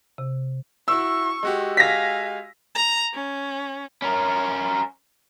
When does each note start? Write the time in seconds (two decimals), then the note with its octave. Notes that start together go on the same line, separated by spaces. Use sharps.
0.18 C3
0.88 E4 F#4 C#6 E6
1.43 G#3 F#4 G4
1.77 F5 G#5 A#6 B6
2.75 A#5
3.14 C#4
4.02 C#4 A#4